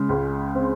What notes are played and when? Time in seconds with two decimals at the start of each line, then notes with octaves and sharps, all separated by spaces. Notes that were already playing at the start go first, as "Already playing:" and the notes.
Already playing: C#3 G#3
0.09 C#2
0.55 C4